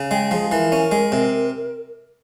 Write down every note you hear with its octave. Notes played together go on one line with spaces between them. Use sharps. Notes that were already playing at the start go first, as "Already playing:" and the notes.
Already playing: C#3
G#3 G5
F3 G#4
E3 A#4
C#4
G#3
C3